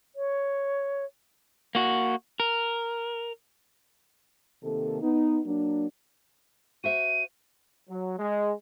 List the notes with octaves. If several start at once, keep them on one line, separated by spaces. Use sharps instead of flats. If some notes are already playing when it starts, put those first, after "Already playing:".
C#5
A#3 F#4
A#4
C3 D#3 A#3 A4
B3 D#4
F#3 A#3 D4
F#4 C5 E5 D#7
F#3
G#3